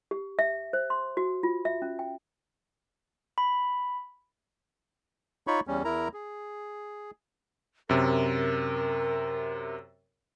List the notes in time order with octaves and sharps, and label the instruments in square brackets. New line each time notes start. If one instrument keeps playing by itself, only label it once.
[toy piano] G4
E5
C5
C6
F#4
F4
E5
C#4
G5
[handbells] B5
[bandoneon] D#4 F4 C#5 B5 C#6
E2 G3 C#4
E2 E4 A#4 A#5
G#4
[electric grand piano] F#2 C3 [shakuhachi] A#4